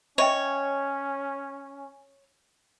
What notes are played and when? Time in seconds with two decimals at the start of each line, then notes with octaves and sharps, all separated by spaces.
0.18 C#4 C#5 D#5 E5 G5